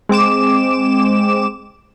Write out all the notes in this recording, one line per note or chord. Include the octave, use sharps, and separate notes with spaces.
G#3 C4 D6 E7